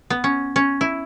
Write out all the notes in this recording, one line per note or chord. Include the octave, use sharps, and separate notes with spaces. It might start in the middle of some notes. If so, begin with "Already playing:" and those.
B3
C#4
C#4
E4